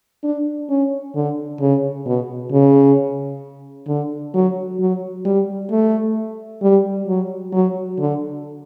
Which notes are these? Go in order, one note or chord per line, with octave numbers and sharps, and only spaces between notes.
D4
C#4
D3
C#3
B2
C#3
D3
F#3
F#3
G3
A3
G3
F#3
F#3
D3